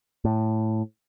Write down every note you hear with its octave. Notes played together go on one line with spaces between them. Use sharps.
A2